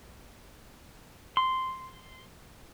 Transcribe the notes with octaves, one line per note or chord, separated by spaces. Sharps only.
C6